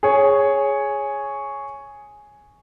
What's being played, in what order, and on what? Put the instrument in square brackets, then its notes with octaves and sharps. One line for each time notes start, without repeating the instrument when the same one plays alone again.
[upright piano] G#4 C#5